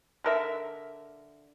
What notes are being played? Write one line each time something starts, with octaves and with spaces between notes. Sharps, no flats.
D3 A#4 E5